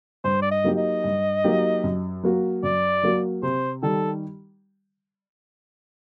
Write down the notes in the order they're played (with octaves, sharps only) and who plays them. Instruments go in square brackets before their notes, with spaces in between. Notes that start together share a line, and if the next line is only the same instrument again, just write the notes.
[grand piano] G2 [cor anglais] C5
[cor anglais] D5
D#5
[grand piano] F#3 A#3 D#4 G4
[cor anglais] D#5
[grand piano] G2
F#3 A#3 D#4 G4
F#2
F#3 A#3 F#4
[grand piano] F#2 [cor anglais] D5
[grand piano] F#3 A#3 F#4
[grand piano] C3 [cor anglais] C5
[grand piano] D#3 G3 [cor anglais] A4